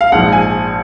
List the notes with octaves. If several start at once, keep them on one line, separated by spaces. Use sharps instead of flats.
F5
A#1 G#2 F3 F#5
G#5